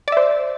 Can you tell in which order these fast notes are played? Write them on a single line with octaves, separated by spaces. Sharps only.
D5 E5 C5